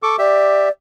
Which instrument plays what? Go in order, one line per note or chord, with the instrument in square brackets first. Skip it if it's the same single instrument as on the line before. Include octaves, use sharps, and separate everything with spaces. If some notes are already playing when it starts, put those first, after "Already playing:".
[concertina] A4 C#6 D6
[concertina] G4 E5 [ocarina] D5